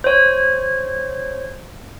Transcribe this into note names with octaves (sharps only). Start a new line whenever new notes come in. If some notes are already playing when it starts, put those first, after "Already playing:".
C5 C#5